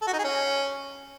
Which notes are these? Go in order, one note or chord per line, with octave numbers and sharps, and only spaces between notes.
A4
F#4
D#4
G#4
C#4